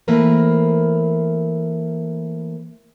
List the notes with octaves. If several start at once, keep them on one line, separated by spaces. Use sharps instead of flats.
E3 A3 A#3 C4 A#4 B4